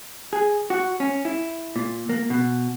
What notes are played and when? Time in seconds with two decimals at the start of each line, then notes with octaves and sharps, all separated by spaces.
0.33 G#4
0.70 F#4
1.00 C#4
1.25 E4
1.76 A#2
2.09 A#3
2.30 B2